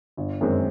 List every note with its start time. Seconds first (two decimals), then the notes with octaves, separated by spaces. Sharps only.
0.17 G1
0.41 F#2 D#3 G#3 C4